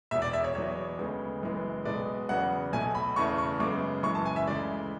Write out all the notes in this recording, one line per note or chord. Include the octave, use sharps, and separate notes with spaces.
E1 E2 B2 E5
D5
E5
C#5
E2 B2 F#3 B3 C#5
D2 C#3 G#3 B3
F#1 F#2 E3 G#3 B3
B1 B2 G#3 B3 D5
E2 C#3 F#3 B3 F#5
B1 B2 A3 G#5
B5
E2 C#3 E3 A3 C#6
C#6
F#2 C#3 G#3 B3 D6
F#1 F#2 C#3 E3 G#3 C#6
A5
G#5
E5
D2 C#3 E3 G#3 D5